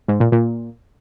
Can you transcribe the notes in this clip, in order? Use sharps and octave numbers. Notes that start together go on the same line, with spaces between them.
G#2
A#2
A#2